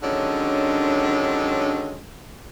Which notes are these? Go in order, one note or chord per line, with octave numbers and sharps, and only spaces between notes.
D3 D#3 F#3 G#3 C#4 D4